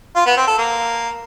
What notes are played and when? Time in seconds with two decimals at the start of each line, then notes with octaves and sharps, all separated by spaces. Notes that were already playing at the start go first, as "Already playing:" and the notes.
0.15 F4
0.26 B3
0.37 C4
0.47 A4
0.58 A#3